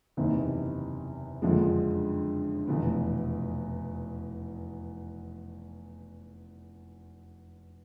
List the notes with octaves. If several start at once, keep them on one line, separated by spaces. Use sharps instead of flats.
F#1 E2 C3 D#3
F#1 F2 D3 F3 G#3
F1 E2 B2